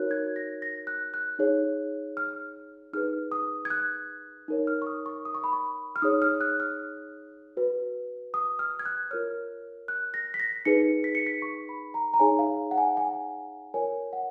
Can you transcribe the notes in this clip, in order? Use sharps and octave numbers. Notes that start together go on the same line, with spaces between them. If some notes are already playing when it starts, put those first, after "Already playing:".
Already playing: D#4 F#4 A#4 C#5 F#6
G#6
A#6
A#6
F#6
F#6
D#4 G#4 C#5
F6
D#4 G#4 B4 F6
D#6
G#6
F#6
D#4 A#4 C#5
F6
C#6
D#6
C#6
D#6
C#6
B5
C#6
F6
D#4 G#4 C#5 D#6
F6
F#6
F6
F#4 B4
D#6
F6
G#6
F#6
F4 A#4 C#5 F6
F#6
A#6
B6
A#6
D#4 G#4 B4 C#7
B6
C#7
B6
C#6
B5
A#5
A#5
D#4 G#4 C#5 G#5
F5
F#5
G#5
G#5
F4 A#4 C#5 G#5
F#5